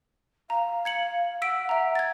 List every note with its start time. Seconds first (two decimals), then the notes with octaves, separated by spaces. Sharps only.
0.50 F5 A#5
0.85 G#6 C#7 F#7
1.42 F#5 E6 B6 D7
1.69 E5 A#5
1.95 G#6 A6